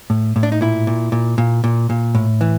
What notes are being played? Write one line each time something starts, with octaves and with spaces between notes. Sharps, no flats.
A2
A2
D4
D#4
A#2 E4
A#2
A#2
A#2
A#2
A#2
A2
E3